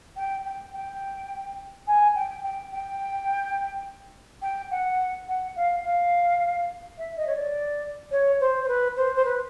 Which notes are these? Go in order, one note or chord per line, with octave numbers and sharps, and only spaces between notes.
G5
G5
G5
G#5
G5
G5
G5
G5
F#5
F#5
F5
F5
E5
D#5
C#5
D5
C#5
C5
C5
B4
C5
C5
B4